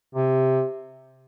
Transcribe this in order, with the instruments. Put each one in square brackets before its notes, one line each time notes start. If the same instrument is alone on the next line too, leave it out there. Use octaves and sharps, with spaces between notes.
[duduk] C3